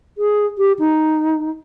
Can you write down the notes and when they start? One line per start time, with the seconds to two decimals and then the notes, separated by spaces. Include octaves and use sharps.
0.18 G#4
0.58 G4
0.79 D#4